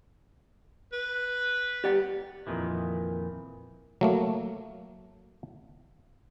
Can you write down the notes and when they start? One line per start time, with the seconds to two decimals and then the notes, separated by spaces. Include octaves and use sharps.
0.92 B4
1.84 G4 D5 F#5
2.47 F2 A#2 D#3 E3
4.01 F#3 A3 A#3